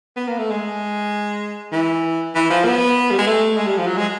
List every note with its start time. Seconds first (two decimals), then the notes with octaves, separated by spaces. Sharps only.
0.16 B3
0.28 A#3
0.38 A3
0.51 G#3
1.72 E3
2.35 E3
2.50 F3
2.65 B3
3.11 G3
3.18 G#3
3.26 A3
3.57 G#3
3.67 G3
3.78 F3
3.87 F#3
3.97 G#3